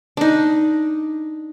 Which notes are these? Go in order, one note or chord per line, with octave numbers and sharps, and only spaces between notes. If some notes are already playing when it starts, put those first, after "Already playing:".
D4 D#4